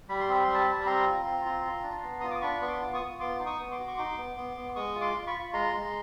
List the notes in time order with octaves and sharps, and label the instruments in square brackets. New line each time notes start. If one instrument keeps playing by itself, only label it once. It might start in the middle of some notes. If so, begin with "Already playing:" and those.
[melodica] G3 B5
C6
C4 B5
G3 C6
A5 B5
G3
B5
C4 A#5 C6
F4
C4
F4
F4
D4
B3
F4 D#6
D6
D4 B5 C#6
B3 C#6
C6 D6
F4
C#6 D#6
F4
B3 C6 D6
D#4
C#6 D#6
B3
C6 D6
F#4
C#6
D#4 C6 D6
B3
B3
B3
G#3 C#6 D#6
F4
C6 D6
F4
B5 C#6
F4
G#3 A#5 C6
G#3